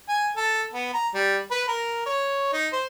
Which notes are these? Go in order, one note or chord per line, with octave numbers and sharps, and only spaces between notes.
G#5
A4
B3
A#5
G3
B4
A#4
C#5
D#4
C5